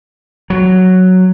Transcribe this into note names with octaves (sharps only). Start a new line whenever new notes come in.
F#3